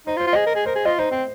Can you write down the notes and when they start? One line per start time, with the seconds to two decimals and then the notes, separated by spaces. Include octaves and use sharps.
0.07 D#4 C5
0.17 F4
0.20 C5
0.27 F4
0.33 D#5
0.36 G#4
0.46 A#4
0.55 G#4
0.66 A#4 C5
0.75 G#4
0.85 F4 D#5
0.99 D#4 C5
1.11 C4 C5